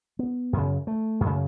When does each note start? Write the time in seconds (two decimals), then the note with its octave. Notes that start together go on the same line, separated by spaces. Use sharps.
0.19 B3
0.53 F#2 C#3
0.87 A3
1.21 F#2
1.26 C#3